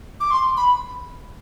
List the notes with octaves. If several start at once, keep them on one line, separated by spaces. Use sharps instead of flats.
D6
C6
B5